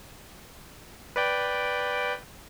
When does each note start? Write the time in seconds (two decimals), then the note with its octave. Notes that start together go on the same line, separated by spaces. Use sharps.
1.16 B4 D5 G5